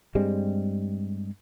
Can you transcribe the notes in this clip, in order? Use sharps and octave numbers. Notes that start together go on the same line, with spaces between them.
G2 G3 G#3 C4